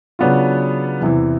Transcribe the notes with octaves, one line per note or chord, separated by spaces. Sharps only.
C#3 F#3 B3 D4 F4
E2 C3 E3